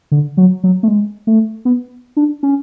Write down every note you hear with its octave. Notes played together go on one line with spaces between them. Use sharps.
D3
F#3
F#3
A3
G#3
A3
B3
D4
C#4